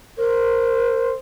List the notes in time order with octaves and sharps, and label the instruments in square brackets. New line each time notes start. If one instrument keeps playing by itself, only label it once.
[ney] A#4 [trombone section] C5